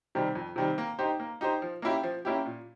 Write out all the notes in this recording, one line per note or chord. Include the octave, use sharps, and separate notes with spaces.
C3 D#3 G3 C4
F2
C3 D#3 G3 C4
A#3
D#4 G4 C5
A#3
D#4 G4 C5
F3
A#3 C#4 E4 G4
F3
A#3 C#4 E4 G4
A#2